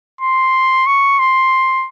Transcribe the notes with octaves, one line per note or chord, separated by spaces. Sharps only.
C6
C#6
C6